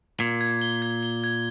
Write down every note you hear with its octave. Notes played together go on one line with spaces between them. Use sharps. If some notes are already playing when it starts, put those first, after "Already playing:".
A#2 G#6
G#6
G7
G#6
G7
G#6